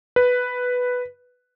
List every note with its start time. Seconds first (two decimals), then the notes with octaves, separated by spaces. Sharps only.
0.16 B4